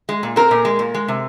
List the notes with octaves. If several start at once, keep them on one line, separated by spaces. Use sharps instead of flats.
G#3
A#2
C4 A#4
A#2
G#3
A#2
G#3
C3